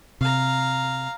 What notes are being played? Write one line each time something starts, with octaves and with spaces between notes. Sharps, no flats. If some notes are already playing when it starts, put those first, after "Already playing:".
C3 F5 A#5